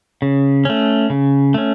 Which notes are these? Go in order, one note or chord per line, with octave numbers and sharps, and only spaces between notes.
C#3
A3 C#4
C#3
A3 C#4